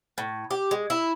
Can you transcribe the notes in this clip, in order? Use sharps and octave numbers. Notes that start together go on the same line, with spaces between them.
A2
G4
G#3
E4